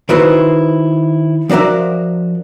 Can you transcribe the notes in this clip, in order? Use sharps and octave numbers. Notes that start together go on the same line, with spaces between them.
D#3 E4 F#4 B4 C5
F3 D4 F#4 A#4 E5